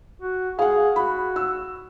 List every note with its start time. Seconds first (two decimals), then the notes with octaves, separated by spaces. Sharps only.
0.22 F#4
0.59 G#4 F5 F#5
0.96 F#4 B5
1.36 E6